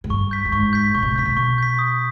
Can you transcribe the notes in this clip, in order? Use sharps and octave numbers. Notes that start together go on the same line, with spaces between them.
G#2
G2 C#6
G6 B6
G2
G#2 C#6
G6 B6
A#2 C#6
B2
A#2
B2 G6 B6
A#2
B2 C#6
G6 B6
D#6